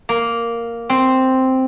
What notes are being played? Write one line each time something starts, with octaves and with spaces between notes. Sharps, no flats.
A#3
C4